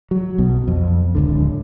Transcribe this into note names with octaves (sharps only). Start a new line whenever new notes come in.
F#3
B1 B2
F2
D1 C#2 D3